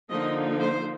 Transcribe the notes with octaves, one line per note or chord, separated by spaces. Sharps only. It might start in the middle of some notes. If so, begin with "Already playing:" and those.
D3 F3 A#3 D#4 D#5
C5